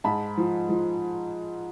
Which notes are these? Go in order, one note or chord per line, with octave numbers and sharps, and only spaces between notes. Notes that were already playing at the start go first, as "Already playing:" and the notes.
G#2 A5 B5
F3
F3